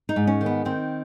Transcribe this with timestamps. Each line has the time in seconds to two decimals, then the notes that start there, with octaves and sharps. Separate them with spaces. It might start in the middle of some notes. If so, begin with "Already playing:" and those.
0.09 D#4
0.16 G#2
0.27 C#4
0.41 D#3
0.46 B3
0.65 D#3 C4